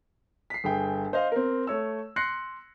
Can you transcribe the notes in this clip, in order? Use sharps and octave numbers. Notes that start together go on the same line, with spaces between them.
B6 C7
G1 G#4 G5
C5 D#5 F5
C4 A#4
A3 C#5 E6
C6 F#6 A#6 C7 C#7